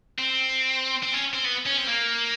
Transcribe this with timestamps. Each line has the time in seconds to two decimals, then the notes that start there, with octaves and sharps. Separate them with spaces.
0.19 C4
1.03 C4
1.14 C#4
1.34 C4
1.44 B3
1.66 C#4
1.77 C4
1.87 A#3